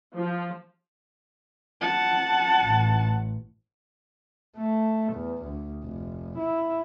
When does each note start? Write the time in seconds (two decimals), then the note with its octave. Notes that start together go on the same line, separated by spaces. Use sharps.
0.15 F3
1.81 F#5 A5
2.63 A1
4.57 A3
5.14 E2
5.44 D2
5.84 F1
6.39 E4